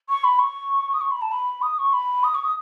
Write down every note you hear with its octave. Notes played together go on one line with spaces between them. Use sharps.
C#6
B5
C#6
D#6
C#6
B5
A5
B5
D#6
C#6
B5
D#6
C#6
D#6